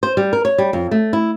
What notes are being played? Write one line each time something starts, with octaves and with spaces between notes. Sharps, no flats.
C5
G3
A#4
C#5
G3
F2
A3
E4